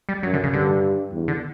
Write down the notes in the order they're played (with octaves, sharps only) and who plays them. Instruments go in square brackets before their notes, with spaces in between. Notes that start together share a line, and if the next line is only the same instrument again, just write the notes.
[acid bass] G3
[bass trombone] F#2 [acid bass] F#3
[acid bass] D3
C#3
[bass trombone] G2 [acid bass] D3
[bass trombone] E2
[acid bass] D3